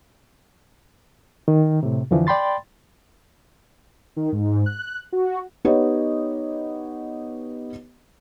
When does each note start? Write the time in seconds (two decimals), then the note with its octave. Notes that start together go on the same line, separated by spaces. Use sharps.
1.48 D#3
1.83 A2 C3
2.11 F2 D3 E3 F3
2.27 D5 G5 B5 C6 A6
4.16 D#3
4.32 G#2
4.66 F#6
5.13 F#4
5.65 B3 D#4 G4 B4 C#5 D#5